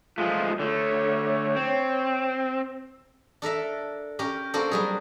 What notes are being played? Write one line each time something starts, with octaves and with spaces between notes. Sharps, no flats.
F3 G#3 A3 F4
D3 A3 C#5
C4
D4 A4 A#4 E5
C#4 G4 A#4
A#3 C4 D4 F#4 A4
F#3 G3 G#4